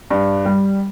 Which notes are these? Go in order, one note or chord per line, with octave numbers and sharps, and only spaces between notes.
G2
G3